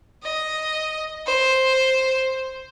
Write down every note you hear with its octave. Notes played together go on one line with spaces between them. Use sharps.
D#5
C5